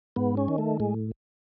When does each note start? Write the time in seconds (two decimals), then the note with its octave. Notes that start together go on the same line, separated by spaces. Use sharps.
0.16 G#2 B3
0.37 C#4
0.48 D#3
0.58 A3
0.80 A2 G#3